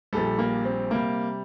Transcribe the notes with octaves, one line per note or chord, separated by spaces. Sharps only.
A#1 A#2 G3 A4
A#3
C4
C3 G3 A#3